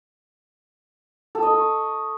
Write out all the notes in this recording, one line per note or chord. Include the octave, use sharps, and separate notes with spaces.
A4
D#5
A4
C#6